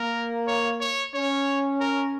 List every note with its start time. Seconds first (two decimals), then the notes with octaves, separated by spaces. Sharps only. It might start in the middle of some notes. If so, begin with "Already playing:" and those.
Already playing: A#3 A#4
0.47 C#5
0.81 C#5
1.14 C#4 C#5
1.80 A#4